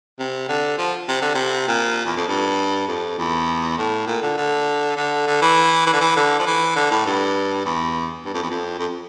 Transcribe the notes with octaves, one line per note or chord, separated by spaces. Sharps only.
C3
D3
F3
C3
D3
C3
A#2
E2
F2
G2
F2
E2
A2
A#2
D3
D3
D3
D3
E3
E3
D3
E3
D3
F3
E3
D3
A2
G2
E2
G2
F2
E2
F2
F2